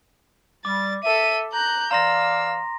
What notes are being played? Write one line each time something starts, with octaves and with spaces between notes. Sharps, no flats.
G3 D6 A6
A4 E5 D#7
A#5 F#6 G6
E3 D5 F5 A#5 C6 E6 A#6